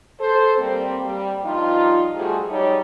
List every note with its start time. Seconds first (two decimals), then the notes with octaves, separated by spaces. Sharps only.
0.20 A4 C5
0.58 G3 A#3 C4
1.04 G3
1.43 G2 F3 D#4 F4
2.16 F3 G3 A3 F#4 G#4
2.50 F#3 G3 D#4 C#5